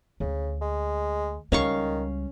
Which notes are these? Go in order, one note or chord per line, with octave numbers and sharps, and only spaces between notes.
D2 C#3
G#3
C#2 D#3 G3 C#4 F5 C#6